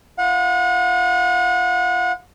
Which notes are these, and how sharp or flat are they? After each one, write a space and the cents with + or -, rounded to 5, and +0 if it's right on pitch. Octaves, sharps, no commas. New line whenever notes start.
F4 -40 F#5 -35